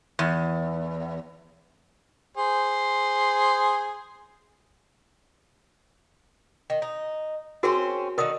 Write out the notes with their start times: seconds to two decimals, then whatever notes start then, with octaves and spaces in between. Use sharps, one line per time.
0.19 E2
2.37 G#4 C5
6.70 D#3
6.82 D#4
7.63 C4 C#4 F#4 G#4 A#4 C5
8.18 D3 D#3 A#4 D#6